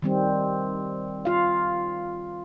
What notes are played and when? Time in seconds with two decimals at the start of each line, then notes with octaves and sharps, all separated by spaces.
0.02 D#3 G3 C4
1.25 F4 F5